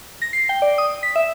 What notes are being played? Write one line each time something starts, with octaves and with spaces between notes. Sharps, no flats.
A#6
C7
G5
D5
D#6
B6
E5